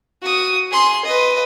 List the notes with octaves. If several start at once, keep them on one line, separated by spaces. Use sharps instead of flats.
F#4 D#6
G#4 C6
B4 D#5